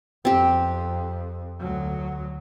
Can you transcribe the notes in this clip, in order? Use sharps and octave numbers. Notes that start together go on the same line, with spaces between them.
F2 C4 G4
D2 F#3